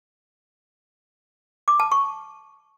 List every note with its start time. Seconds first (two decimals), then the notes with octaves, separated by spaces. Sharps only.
1.68 D6
1.80 A5
1.92 C#6